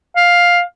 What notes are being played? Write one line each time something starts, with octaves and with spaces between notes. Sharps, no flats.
F5